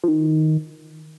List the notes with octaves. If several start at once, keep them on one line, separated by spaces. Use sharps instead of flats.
F3
D#3